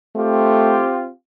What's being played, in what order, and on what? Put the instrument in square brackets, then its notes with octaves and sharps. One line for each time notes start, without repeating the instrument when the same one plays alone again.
[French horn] A3 [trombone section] C4 F4 G4